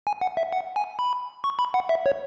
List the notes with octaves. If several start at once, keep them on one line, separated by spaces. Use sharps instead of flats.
G#5
F#5
E5
F#5
G#5
B5
C#6
B5
F#5
E5
C#5